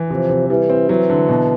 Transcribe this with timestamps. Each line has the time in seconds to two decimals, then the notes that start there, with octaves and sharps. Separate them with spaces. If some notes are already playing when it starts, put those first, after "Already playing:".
Already playing: E3
0.10 C3 F3
0.29 C3
0.49 E3 G3
0.70 C4
0.89 E3 F#3
1.09 D3
1.29 B2